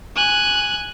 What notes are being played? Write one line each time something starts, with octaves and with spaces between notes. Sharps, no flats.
G#5 F#6